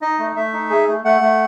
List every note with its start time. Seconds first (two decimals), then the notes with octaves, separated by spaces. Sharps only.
0.02 D#4 D#5
0.19 A3
0.36 A3 E5
0.53 D#4
0.70 G#4
0.88 A3
1.04 A3 F#5
1.21 A3